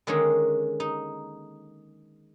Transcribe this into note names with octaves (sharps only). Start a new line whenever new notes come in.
D3 D#3 G#3 A#3 C#4 G#4
D#4